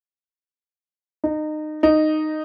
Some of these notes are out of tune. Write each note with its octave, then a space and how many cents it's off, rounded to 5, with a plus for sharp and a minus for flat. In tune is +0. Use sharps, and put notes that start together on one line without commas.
D#4 -25
D#4 -10